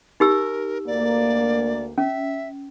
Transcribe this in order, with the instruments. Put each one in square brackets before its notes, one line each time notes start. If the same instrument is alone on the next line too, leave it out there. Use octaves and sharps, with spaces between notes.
[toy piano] D#4 G4 E6 [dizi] A#4
[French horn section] D2 A#3 [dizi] D5
[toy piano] C#4 [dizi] E5